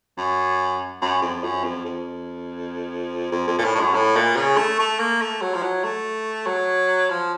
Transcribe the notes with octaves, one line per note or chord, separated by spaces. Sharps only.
F#2
F#2
F2
F#2
F2
F2
F2
F2
A#2
A2
A2
F#2
A2
A#2
C#3
A3
A3
A#3
A3
F#3
F3
F#3
A3
F#3
F3